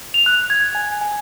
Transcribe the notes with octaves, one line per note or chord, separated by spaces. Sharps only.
F7
F#6
G#6
G#5
G#5